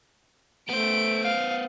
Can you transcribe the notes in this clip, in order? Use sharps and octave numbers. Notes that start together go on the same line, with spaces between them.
A3 B3 C5 D7
F5